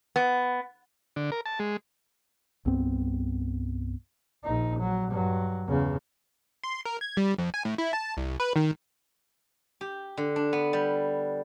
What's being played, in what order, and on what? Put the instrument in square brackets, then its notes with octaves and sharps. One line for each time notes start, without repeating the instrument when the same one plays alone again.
[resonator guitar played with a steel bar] B3
[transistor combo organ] D3
A#4
A5
G#3
[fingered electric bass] C2 G2 B3 C4
[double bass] A#1 D#4
F#3
G2 F#3
E2 C#3
[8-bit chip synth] C6
A#4
G#6
G3
F2
G#5
A2
E4
A5
C2
B4
D#3
[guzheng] G4
D3
D4
B3
G3